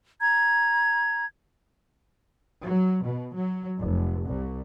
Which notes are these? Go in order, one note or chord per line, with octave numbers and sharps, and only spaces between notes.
A#5 G#6
F#3
B2
F#3
F1
C2